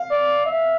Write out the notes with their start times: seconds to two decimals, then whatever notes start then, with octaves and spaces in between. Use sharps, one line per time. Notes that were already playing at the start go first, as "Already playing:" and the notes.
Already playing: F5
0.11 D5
0.46 E5